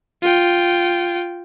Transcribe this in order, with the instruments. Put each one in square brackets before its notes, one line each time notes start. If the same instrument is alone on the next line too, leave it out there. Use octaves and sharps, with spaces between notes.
[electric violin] F4 G5